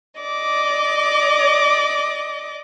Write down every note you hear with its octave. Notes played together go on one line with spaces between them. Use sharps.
D5 D#5 D6